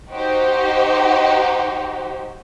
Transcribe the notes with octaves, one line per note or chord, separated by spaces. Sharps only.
D#4 F#4 G4 C5